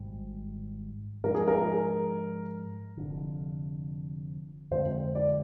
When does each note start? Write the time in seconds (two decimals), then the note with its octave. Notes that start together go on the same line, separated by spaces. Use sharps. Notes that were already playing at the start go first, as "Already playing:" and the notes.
Already playing: G#1 G#2 G3
1.24 G#2 F3 G#3 D4 A#4
1.35 G#4
1.48 A#4
2.97 F1 F2 D3
4.71 F2 D3 G#3 C4 C5
5.15 D5